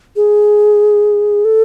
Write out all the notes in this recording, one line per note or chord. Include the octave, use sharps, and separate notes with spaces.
G#4
A4